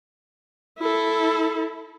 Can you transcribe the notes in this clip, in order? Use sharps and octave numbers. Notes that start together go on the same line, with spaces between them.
E4 A4